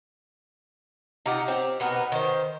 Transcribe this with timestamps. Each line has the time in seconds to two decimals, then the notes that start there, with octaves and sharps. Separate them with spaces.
1.26 D#4 F4 G4 F#5
1.48 C4 G4
1.80 B2 B3 D#4 A#4
2.12 D#3 C5